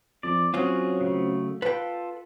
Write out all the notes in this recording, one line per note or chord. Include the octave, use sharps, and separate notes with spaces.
F2 D5
F#3 C4 C#4 F4 F#4 G#4
C#3 A3
F4 A4 B4 G5